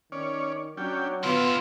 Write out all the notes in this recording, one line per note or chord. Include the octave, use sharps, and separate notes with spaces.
D#3 C#4 C#5 D5
F#3 C#4 D4 G5
D3 B3 E4 F4 C6